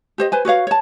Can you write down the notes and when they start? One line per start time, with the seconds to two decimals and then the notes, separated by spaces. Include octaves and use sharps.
0.18 G4 C5 D#5
0.32 B4 C5 G#5
0.45 F#4 B4 C#5 F5
0.67 C#5 A5